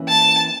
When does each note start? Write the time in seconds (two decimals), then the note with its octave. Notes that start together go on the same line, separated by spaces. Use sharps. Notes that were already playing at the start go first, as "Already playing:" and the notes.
Already playing: E3 A#3 C#4 E4
0.09 A5